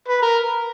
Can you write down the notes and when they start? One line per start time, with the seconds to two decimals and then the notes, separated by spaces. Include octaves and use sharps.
0.09 B4
0.23 A#4